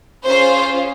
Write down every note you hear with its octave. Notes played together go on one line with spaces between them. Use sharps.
C#4 F4 G#4 C5